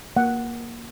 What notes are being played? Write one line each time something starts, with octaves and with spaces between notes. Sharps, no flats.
A#3 F#5